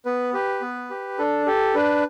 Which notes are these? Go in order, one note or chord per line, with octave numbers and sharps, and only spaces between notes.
B3 B4
G4 B4
B3
G4
D4 A4
G4 A4
D4 B4